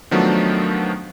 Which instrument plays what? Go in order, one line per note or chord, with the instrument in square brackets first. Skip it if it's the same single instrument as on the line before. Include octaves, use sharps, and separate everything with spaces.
[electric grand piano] D#3 F3 F#3 A3 B3 D4